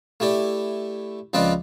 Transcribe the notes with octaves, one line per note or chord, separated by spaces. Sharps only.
A3 E4 G4 D5
C#2 F3 C4 B4 D5 D#5